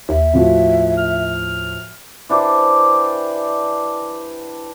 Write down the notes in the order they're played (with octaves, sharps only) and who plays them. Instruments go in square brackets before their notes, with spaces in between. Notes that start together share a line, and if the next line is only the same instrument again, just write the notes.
[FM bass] D#2 [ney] E5
[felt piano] A2 F3 F#4
[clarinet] F6
[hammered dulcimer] E3 D4 G4 C5